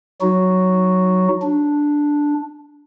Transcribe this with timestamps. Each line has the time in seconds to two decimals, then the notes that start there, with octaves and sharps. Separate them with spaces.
0.21 F#3 D#4 F#4
1.42 D4